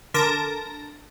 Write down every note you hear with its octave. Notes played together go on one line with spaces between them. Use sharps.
D3 A#4 A5 A#6 D7